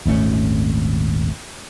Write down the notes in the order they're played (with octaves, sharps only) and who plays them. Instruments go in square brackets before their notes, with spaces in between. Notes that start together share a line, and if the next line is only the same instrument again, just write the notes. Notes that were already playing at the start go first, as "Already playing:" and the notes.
[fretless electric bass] D#1 G#1 A3 C#4